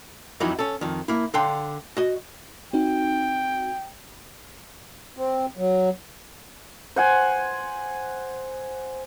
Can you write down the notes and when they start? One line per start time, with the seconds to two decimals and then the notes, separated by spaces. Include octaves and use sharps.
0.40 F2 E3 F#3 D#4 E4 F#4
0.59 C#4 A4
0.81 F2 D#3
1.08 A#3 E4
1.34 D3 D4 F5 G5 C6
1.97 F#4 D#5
2.73 C4 D#4 F#4 G5
5.17 C4
5.57 F#3
6.96 C5 F#5 G#5